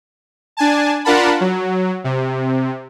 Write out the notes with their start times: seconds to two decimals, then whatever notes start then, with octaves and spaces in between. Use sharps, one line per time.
0.57 D4 G#5 A5
1.04 D4 F4 A#4 F#5 A5 B5
1.40 F#3
2.04 C3